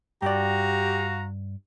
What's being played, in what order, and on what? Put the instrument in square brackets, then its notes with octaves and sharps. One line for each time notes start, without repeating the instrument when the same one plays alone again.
[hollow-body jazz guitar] G2 D5 [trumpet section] F#4 F5 A#5 [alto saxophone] G4